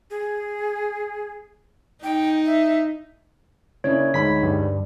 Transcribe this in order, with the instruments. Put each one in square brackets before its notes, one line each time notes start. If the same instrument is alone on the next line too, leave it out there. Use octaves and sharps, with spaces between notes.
[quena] G#4
[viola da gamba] D#4 [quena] G5
[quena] E5
[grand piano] C#3 A#3 D4 [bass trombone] E4 [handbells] C#5
[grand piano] D2 B5 [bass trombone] G#2 [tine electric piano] B6
[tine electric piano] G2 G3